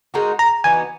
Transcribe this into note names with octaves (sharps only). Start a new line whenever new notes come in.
G#3 D#4 F#4 A#4
A#5
E3 B3 D#4 F#4 G#5